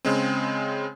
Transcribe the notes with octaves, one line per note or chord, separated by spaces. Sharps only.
C#3 G#3 C4